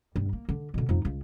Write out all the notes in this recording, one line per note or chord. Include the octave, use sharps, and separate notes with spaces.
G2
A#3
D3
B2 D3
F2 D#4
C#2